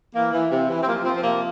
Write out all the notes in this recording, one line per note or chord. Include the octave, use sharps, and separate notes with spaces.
E3 A#3
E3
C3
E3
C4
F3 A#3
F3 C4
C4
C3 A#3